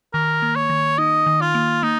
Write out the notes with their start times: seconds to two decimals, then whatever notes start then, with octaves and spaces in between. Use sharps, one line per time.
0.14 D#3 A#4
0.42 A#3
0.56 C#5
0.70 D#3
0.98 D#4 D#5
1.27 D#3
1.41 F4
1.55 A#3
1.83 A#3 D#4